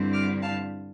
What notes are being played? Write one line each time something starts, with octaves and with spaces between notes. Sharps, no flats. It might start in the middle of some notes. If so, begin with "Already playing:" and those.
Already playing: G2 D3 G3 C4 E4
D6 F6
F5 A5